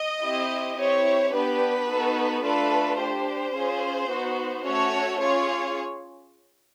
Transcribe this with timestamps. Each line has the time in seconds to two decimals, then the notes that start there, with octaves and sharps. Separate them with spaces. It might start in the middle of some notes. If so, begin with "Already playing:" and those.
Already playing: D#5
0.24 C4 E4 G4
0.79 C4 E4 G4 C#5
1.34 B3 D4 G4 B4
1.89 B3 D#4 F#4 A4
2.44 A3 D4 F4 A4 B4
2.99 D4 G4 C5
3.55 C#4 F4 G#4
4.10 B3 D#4 F#4
4.65 A3 C#4 F#4 A4 C#5
5.20 C#4 F4 G#4 C#5